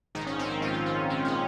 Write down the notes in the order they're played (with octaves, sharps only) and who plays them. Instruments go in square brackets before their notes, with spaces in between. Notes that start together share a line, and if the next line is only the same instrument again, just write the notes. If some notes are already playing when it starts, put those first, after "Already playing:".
[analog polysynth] A#1 G#2 D#3 D#4
C#4
C4
C#4
A#1 G#2 D#3 F4
C#4
C#4
A#1 G#2 D#3 C#4
C#4